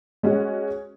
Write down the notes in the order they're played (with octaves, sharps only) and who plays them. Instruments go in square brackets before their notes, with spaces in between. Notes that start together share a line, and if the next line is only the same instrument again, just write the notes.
[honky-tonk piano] G#3 C#4 F#4